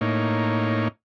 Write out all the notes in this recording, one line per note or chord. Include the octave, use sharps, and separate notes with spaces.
A2 A#3 D#4 C#5